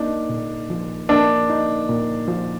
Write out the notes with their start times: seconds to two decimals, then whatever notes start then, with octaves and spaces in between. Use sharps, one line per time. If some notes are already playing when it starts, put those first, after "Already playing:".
Already playing: A#3 D4 D#4
0.29 A#2
0.70 F3
1.09 A#3 D4
1.50 D#4
1.89 A#2
2.28 F3